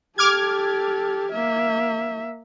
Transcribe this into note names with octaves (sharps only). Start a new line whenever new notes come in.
G4 A4 D6 F6 G#6
A#3 E5